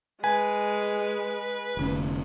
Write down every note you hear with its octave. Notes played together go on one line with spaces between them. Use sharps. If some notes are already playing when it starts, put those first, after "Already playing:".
G#3 B4 G#5
F1 D3 C#4